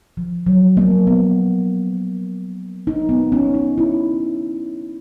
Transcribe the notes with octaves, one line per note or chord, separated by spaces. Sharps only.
F3
F#3
A#3
B3
D#4
B3
C#4
D#4
E4